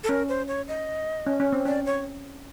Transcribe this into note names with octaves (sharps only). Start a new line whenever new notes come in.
A4
C#4 A#4
C5
C#5
D#5
C#4
C#4
C4
C#4 D5
C#5